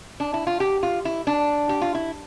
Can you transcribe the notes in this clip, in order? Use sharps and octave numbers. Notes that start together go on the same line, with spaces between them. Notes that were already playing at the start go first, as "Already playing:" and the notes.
D4
E4
F4
G4
F4
E4
D4
G4
F4
E4